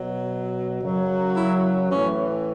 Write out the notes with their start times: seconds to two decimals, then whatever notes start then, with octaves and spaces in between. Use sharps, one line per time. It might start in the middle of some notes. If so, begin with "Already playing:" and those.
Already playing: B2 F#3
0.81 F#2 C#3 F#3
1.35 E4
1.89 A2 E3 C#4